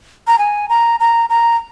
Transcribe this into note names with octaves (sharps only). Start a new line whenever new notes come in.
A#5
G#5
A#5
A#5
A#5